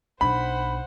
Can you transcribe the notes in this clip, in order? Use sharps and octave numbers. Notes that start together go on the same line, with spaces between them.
B1 D4 C5 F#5 B5